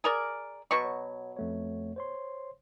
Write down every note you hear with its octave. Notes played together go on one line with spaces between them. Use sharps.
G#4 A#4 D5
B2 F#3 C#6
C#5
F2 A3 C#5
C5 C#5 C6